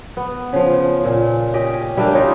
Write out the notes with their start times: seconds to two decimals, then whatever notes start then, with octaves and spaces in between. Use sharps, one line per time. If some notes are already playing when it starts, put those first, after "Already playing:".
0.17 B3
0.53 C#3 F3
1.05 A#2
1.54 C#4 G4 D#5 G5
1.97 G3 A3 A#3 D4
2.14 C#4 D#4 F4